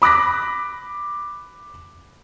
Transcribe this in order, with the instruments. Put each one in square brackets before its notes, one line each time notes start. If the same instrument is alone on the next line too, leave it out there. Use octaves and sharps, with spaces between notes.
[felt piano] B5 D6 F#6 A#6 B6